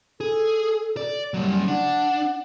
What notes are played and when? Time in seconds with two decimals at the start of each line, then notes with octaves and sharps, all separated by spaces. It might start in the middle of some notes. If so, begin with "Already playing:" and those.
0.21 G#4 A4
0.97 D5
1.34 C#3 F#3 G3
1.68 D4 F#5